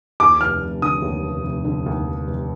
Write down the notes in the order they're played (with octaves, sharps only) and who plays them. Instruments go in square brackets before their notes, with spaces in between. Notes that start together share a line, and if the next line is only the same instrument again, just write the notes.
[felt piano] D#2 [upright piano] D6
[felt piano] F1 [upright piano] F6
[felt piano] F1
[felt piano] D3 [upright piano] D#6
[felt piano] D#2
F1
F1
D3
D#2
F1
F1